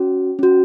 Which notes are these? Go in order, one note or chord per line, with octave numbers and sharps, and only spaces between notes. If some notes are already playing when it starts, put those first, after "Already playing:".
Already playing: C#4 F#4
C#4 F#4